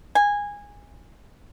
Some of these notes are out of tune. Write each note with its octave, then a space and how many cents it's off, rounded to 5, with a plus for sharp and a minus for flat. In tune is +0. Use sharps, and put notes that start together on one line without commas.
G#5 -15